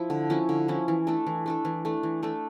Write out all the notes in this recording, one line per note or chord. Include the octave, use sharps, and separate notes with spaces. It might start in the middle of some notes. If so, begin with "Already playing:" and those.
Already playing: F3 E4
D3
F3 C#4 E4
D3
F3 C#4 E4
E3
A3 D4 A4
E3
A3 D4 A4
E3
A3 D4 A4
E3
A3 D4 A4